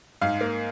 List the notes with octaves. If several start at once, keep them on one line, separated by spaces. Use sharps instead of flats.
G#2 F5
A#3